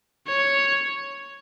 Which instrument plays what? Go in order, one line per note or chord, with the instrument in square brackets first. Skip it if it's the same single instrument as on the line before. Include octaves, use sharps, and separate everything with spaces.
[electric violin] C#5